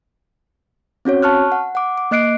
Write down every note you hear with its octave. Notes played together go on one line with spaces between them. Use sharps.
C4 C#4 F#4 C#5
A5 C#6 F6 F#6
F#5
F#5 D6
D6
A#3 D#5 F#6 C7 D7